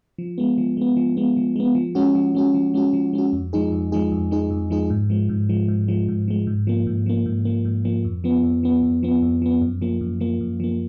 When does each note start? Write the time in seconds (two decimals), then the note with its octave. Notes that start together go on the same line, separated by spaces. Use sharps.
0.18 F3
0.38 G#3 B3
0.58 F3
0.77 G#3 B3
0.97 F3
1.17 G#3 B3
1.37 F3
1.56 G#3 B3
1.75 F3
1.95 G#3 C#4 F#4
2.15 F3
2.35 G#3 C#4 F#4
2.54 F3
2.74 G#3 C#4 F#4
2.93 F3
3.13 G#3 C#4 F#4
3.33 F2
3.53 F3 G#3 D#4 G#4
3.72 F2
3.92 F3 G#3 D#4 G#4
4.12 F2
4.31 F3 G#3 D#4 G#4
4.51 F2
4.70 F3 G#3 D#4 G#4
4.90 G#2
5.10 F3 G#3
5.29 G#2
5.49 F3 G#3
5.68 G#2
5.88 F3 G#3
6.08 G#2
6.28 F3 G#3
6.47 G#2
6.67 F3 A#3
6.87 G#2
7.06 F3 A#3
7.26 G#2
7.45 F3 A#3
7.65 G#2
7.85 F3 A#3
8.05 F2
8.24 F3 B3
8.44 F2
8.63 F3 B3
8.83 F2
9.03 F3 B3
9.22 F2
9.42 F3 B3
9.61 F#2
9.82 F3 A#3
10.01 F#2
10.20 F3 A#3
10.41 F#2
10.60 F3 A#3